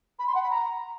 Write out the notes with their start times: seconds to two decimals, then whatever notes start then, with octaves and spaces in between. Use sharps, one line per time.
0.19 B5
0.27 C6
0.35 F#5
0.43 B5
0.51 A#5